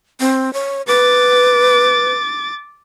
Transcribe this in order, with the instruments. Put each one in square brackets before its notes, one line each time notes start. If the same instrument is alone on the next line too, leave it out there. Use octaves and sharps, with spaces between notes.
[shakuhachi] C4
C#5
[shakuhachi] B4 [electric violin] D6 A6